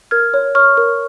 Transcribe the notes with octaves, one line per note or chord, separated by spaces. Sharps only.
A#4 F6 G#6
C#5
C#5 C#6 F6
A#4